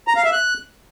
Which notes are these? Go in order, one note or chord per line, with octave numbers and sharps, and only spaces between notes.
A#5
F5
E5
F#6